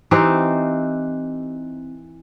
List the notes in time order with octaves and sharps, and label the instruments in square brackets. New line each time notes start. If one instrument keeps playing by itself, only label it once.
[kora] E3 C4 D#4 G4